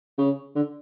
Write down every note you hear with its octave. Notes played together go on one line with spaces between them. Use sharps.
C#3
D3